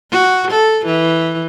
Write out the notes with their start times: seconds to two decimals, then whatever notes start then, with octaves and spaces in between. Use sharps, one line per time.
0.11 F#4
0.51 A4
0.86 E3